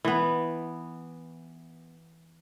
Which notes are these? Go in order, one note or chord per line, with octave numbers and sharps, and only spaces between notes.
E3 B3